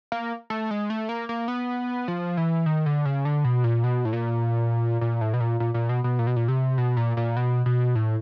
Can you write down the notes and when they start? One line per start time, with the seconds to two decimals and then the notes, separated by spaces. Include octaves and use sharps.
0.12 A#3
0.50 A3
0.71 G#3
0.90 A3
1.09 A#3
1.29 A#3
1.48 B3
2.08 F3
2.37 E3
2.66 D#3
2.86 D3
3.05 C#3
3.25 D3
3.44 B2
3.64 A#2
3.84 B2
4.05 A2
4.13 A#2
5.01 A#2
5.21 A2
5.34 B2
5.40 A#2
5.60 A#2
5.74 A#2
5.89 B2
6.04 B2
6.19 A#2
6.27 B2
6.36 A#2
6.48 C3
6.78 B2
6.97 A#2
7.17 A#2
7.37 B2
7.66 B2
7.95 A2